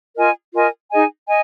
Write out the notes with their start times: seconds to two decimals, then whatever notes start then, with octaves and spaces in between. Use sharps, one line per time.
0.16 F4 A#4 D#5 G#5
0.54 F4 A#4 D#5 G#5
0.91 D#4 G#4 D#5 G#5
1.27 D#5 G#5